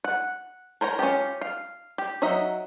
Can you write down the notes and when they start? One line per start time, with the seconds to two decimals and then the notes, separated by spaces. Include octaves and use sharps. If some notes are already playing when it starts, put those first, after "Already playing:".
0.04 F#5
0.81 A#4 C5 C#5 A#5
0.99 C#4 D#4 F4 G4
1.41 F5
1.98 G4
2.22 F#3 D#4 D#5 E5